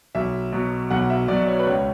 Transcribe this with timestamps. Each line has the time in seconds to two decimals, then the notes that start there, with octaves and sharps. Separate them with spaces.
0.15 B1 E5
0.52 B2 F#3
0.90 B1 F#5
1.10 E5
1.28 B2 F#3 D5
1.47 C#5
1.59 B4
1.66 C#2 C#5